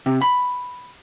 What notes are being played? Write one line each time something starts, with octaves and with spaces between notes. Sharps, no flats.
C3
B5